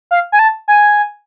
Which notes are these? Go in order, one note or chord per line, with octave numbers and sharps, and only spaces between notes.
F5
G#5
A5
G#5